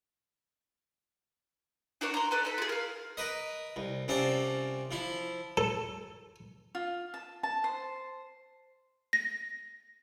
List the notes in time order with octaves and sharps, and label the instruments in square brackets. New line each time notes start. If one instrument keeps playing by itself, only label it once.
[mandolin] D4 F#4 A#4 C#5
A#5 C6
A4 B4 D5
D#4 A4 B5
F4 G#4
A#4 F5
[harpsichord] A#4 B4 D#5
C2
C2 C4 C#4 F4 D5 A5
F3 E4
A4
[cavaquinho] F4
A5
A5
C5
[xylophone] A#6